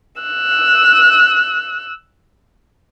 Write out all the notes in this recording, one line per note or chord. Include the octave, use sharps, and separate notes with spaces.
E6 F#6